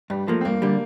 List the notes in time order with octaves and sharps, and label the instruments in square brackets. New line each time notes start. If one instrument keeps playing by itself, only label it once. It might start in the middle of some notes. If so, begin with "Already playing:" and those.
[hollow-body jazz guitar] G2 [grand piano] G3
[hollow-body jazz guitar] F3 A#3 [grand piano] A3
[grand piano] C4
[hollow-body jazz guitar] G2 [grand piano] A#3
[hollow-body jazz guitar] D3 G3